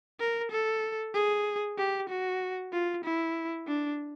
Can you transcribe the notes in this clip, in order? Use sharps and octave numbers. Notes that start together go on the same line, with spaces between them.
A#4
A4
G#4
G4
F#4
F4
E4
D4